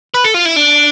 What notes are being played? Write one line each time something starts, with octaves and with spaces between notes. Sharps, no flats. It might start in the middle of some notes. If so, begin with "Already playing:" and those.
B4
A4
F4
E4
D4